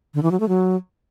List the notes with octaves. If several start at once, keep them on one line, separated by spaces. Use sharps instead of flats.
D3
E3
F#3
A3
F#3